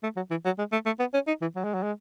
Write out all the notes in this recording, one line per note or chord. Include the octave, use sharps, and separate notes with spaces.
A3
F#3
E3
F#3
G#3
A3
A3
B3
C#4
D#4
E3
F#3
G#3
F#3
G#3